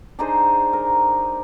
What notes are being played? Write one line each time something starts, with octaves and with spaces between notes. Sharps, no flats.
D4 D#4 G#4 C5
A#4